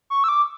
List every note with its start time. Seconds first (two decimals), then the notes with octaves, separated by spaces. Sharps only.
0.10 C#6
0.24 E6
0.29 D6